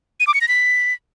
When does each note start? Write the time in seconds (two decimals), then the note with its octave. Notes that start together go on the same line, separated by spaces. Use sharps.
0.20 D#7
0.27 D6
0.34 C#7
0.41 A#6
0.48 B6